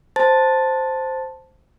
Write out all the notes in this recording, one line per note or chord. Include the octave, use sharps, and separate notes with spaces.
C5 A5 A6